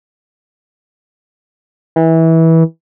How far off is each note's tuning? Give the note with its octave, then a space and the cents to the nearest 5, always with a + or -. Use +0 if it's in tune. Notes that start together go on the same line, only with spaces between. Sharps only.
E3 -20